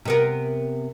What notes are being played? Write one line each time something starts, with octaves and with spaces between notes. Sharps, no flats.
C3 B3 A#4